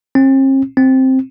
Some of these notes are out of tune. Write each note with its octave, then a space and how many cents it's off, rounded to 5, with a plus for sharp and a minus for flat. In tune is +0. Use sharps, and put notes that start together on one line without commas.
C4 +45
C4 +5